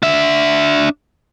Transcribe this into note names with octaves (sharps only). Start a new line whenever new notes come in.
D4 E5